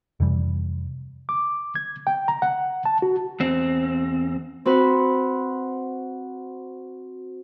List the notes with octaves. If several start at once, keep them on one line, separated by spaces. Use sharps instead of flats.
F2 C3 E3 G3
D6
G#6
G5
A#5
F#5
A5
F#4
E2 C4
C4 F#4 B4